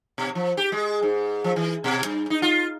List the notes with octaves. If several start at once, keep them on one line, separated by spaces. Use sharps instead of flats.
B2
F3
G4
G#3
G#2
F3
E3
B2
G2
D#4
F4